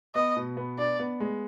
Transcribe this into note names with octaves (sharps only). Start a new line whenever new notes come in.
B3 D#5
B2
B3
D4 D5
B3
G#3